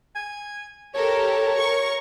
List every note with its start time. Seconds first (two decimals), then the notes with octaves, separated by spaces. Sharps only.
0.15 G#5
0.94 G4 A4 A#4 C#5
1.58 A#4 C#6